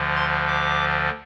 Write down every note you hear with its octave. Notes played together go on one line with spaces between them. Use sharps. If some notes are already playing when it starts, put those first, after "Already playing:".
Already playing: D2 D3 F3
C6
D6